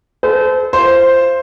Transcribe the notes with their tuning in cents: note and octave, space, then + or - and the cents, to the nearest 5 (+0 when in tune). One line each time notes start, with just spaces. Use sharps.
A4 -30 C5 -35
F4 -35 C5 +0